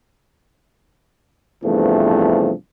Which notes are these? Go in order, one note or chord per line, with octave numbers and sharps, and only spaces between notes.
E2 G2 C3 F3 A3